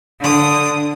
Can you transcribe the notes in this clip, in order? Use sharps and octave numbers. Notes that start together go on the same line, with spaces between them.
D3 D#6